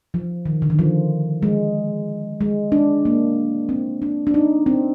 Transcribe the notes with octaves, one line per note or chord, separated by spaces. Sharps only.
F3
D#3
D3
D#3
F3
G#3
G#3
D4
A#3
C4
D4
D4
D#4
C4